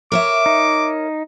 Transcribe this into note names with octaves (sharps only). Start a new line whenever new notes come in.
A#4 C#5 E5 D6
D#4